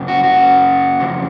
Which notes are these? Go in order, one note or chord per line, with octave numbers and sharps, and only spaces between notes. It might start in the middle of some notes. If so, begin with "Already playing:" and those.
Already playing: F#2 C#3
F#4
F#4
F2 C#3